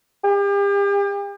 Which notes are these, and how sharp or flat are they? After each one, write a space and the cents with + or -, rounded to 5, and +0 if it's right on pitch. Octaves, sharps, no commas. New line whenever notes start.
G4 +40